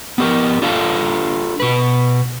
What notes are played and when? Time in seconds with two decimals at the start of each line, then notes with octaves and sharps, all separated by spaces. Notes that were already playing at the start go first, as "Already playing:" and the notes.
0.18 B3 G4 A#4
0.62 D4 F4 A4 F5 A5
1.60 B2 B4